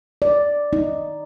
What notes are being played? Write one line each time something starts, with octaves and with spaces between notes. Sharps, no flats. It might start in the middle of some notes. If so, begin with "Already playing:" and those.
D5
D#4